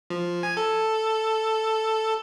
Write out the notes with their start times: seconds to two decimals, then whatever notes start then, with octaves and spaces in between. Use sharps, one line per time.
0.10 F3
0.43 G#5
0.57 A4